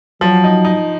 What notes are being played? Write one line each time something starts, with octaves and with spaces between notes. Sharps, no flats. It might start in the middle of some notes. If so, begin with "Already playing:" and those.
F3 F#3
D#4
D#4